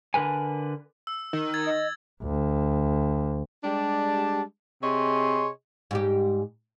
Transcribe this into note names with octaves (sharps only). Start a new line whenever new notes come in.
D3 A#4 B4 G#5
E6
D#3
G#6 A6
D#5
D2
G3 G#3 D4 G4 A5
C3 G#4 C#5 D#5 C6
G#2 G3 G4